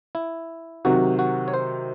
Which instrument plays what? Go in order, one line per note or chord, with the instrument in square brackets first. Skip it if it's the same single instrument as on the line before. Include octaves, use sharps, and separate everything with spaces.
[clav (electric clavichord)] E4
[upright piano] C3 D#3 F#3 [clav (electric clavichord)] F#4
[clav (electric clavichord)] F#4
C#5
C5